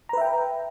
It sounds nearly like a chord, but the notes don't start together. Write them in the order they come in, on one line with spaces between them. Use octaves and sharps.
A#5 B4 E5 G5